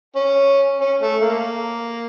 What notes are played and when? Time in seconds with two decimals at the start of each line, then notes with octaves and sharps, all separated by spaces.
0.16 C#4
0.81 C#4
1.02 A3
1.23 A#3